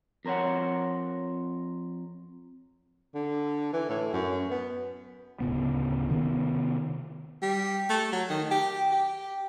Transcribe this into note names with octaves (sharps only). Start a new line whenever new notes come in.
F2 A#4 C5 C#5 F#5
D3
E3
A2
F#2
B3
D1 A2 C#3 B3
C3 D#3 A3 B3
G3
A3
F#3
D#3
G4
G4